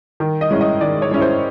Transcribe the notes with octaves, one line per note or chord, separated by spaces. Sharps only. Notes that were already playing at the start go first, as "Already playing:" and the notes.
D#3
D#5
G#3 C#4 E4
D#5
D#3 D5
C#5
G#3 C#4 E4
C5